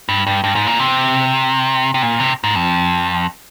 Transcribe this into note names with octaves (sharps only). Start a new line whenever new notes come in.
G2
G2
G2
G#2
A#2
C3
C3
A#2
C3
G#2
F2